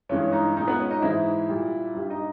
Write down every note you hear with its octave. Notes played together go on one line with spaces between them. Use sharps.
G2 E3 G#3 C#4
D#4
A#2 G#3 D#4
B3 B4
C#4 C#5
D#4 D#5
G#2 E3 G#3 E4 E5
A#2 G3
G2 G3
D#4 D#5